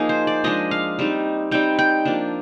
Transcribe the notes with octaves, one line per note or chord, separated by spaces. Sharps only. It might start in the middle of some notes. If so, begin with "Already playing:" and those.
Already playing: F3 A#3 D#4 G#4
C5
D5
F3 G#3 D4 D#5
F5
G3 C4 D#4
G3 C4 D#4 G5
G5
F3 A#3 D4